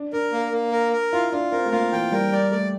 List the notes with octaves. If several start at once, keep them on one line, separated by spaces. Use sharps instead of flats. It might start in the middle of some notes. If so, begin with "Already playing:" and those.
Already playing: D4
D4 A#4
A#3
A#3
A#4
A#4
E4 F4
D4 F4
C4 A#4
A3
A#3 F4
E3 G5
G3 A#4
G3 D5
A3 D5